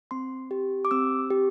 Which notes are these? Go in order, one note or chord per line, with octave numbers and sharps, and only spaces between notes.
C4 C6
G4
D6
C4 E6
G4